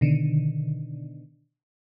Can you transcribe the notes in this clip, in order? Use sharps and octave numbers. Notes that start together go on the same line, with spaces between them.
B2 D3 D#3